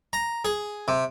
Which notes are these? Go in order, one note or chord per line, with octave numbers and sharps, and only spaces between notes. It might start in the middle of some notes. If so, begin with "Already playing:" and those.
A#5
G#4
C3